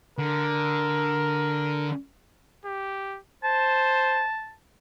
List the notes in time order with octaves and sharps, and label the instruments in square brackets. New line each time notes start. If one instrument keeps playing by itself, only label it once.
[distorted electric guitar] D3 [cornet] A#4
[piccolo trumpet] G4
[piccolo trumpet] C5 [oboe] A5